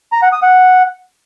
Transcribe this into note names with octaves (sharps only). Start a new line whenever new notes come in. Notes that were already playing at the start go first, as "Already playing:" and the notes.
A#5
F#5
D#6
F#5